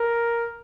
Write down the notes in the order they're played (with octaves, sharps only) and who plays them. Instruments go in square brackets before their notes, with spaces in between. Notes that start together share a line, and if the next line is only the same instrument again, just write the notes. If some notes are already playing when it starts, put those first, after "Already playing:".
Already playing: [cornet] A#4